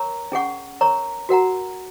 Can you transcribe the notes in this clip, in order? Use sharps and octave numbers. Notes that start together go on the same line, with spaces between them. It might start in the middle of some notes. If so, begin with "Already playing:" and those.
Already playing: A#4 C#5 A#5 C#6
C#4 G#4 F#5 C#6
A#4 C#5 A#5 C#6
F#4 A#4 F#5 A#5